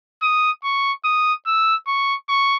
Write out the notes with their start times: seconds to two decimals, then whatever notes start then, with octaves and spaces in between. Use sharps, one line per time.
0.22 D#6
0.63 C#6
1.04 D#6
1.46 E6
1.87 C#6
2.29 C#6